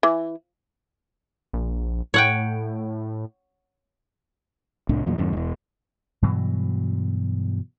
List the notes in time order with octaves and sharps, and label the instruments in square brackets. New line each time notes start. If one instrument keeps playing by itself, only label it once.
[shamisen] E3
[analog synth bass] A#1
[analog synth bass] A2 [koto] C#5 F#5 G5
[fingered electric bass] C2 A2 D4
E2 A#2 F#3
F2 G#2 D3
E1 E2
[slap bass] G2 B2 E3 F#3